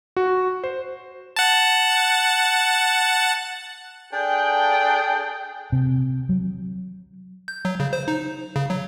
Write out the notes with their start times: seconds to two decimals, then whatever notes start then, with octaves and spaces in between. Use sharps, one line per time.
0.17 F#4
0.64 C5
1.36 F#5 A5
4.12 D4 G#4 A4 G5
5.72 C3
6.29 F#3
7.48 G6
7.65 F#3
7.80 C#3
7.93 C5
8.08 D#4
8.56 C#3
8.70 F#3